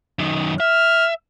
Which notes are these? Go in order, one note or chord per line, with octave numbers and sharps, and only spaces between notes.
F#2 D#3
E5 F6